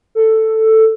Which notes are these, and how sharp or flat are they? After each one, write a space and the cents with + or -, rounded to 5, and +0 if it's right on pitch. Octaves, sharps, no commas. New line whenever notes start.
A4 +5